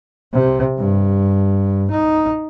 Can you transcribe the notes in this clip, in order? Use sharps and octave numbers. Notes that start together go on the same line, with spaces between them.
C3
G2
D#4